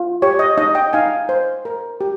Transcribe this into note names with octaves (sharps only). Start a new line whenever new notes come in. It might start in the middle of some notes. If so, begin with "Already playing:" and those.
Already playing: F4
G4 C#5
D#5
D#4 D#5
D#5 G5
D#4 F5 G#5
C5
A#4
G4